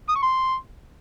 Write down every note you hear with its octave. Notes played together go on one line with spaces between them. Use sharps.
D#6
C#6
C6